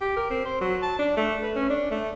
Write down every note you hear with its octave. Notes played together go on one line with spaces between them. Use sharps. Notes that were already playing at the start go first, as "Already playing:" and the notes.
G4
A#4
C4
C5
F#3
A5
D4
A3
B4
C#4
D4
A3